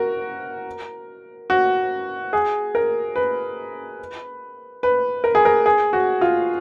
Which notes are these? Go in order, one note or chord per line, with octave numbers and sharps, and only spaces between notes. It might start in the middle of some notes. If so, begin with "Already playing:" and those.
Already playing: F#4 A#4
F#4
G#4
A#4
B4
B4
A#4
G#4
A#4
G#4
F#4
F4